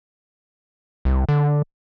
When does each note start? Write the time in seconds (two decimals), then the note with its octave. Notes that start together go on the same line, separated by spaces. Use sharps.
1.05 C2
1.29 D3